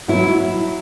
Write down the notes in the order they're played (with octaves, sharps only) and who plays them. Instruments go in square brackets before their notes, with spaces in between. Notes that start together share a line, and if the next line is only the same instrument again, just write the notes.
[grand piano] F#3 [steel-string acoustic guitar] E4